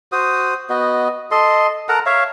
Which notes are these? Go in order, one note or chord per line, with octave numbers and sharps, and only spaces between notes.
F#4 C5 D#6
B3 F#4 D#5
A4 D#5 C6
A4 A#4 F#5 A#5
C#5 E5 F5